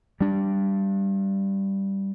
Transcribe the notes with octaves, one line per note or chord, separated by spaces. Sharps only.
G3 D4